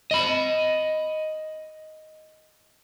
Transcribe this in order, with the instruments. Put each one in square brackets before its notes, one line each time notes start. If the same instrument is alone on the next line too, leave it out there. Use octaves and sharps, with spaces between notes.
[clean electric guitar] D#5 B5